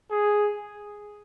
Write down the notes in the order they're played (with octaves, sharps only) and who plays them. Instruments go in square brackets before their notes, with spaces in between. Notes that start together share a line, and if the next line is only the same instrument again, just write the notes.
[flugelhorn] G#4